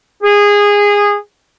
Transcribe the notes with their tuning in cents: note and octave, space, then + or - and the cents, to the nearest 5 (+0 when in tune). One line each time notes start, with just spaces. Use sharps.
G#4 -20